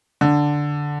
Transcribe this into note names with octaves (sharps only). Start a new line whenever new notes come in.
D3